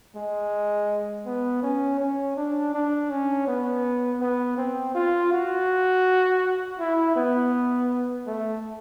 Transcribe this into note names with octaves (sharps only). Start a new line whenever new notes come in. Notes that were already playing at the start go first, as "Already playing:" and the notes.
G#3
B3
C#4
C#4
D4
D4
C#4
B3
B3
C4
F4
F#4
E4
B3
A3